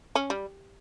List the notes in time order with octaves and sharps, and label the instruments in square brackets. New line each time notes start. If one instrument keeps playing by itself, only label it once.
[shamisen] C#4
G3